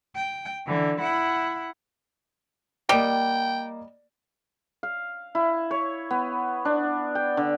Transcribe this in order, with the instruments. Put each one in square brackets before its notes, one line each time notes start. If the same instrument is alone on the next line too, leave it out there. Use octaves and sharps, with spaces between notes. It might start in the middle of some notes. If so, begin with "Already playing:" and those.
[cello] G5
D3 E3
E4 F#5
[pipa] G3 [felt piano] A#3 D5 D#5 [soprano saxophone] G5
[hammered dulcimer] F5
E4
C#5
B3
D4
G5
D3